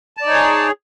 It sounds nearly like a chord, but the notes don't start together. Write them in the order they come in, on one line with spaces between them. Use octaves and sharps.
A5 D5 D#4 C#5 G#4